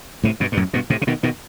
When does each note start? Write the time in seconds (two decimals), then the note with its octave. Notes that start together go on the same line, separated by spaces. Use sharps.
0.24 A2 C3
0.40 G2 B2
0.52 G2
0.57 F#2 A2
0.73 G2 B2
0.90 A2 C3
1.01 C3
1.07 B2 D#3
1.23 B2 D#3